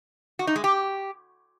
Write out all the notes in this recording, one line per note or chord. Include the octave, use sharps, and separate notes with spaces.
F#4
D#4
G#3
G4